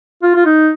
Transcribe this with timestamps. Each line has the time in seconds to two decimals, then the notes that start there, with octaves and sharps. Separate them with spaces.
0.23 F4
0.36 F4
0.46 D#4